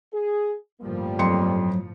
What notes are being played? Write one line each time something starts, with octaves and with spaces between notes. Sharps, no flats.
G#4
G1 A2 F3 G3 A#3
F2 F#3 C6 C#7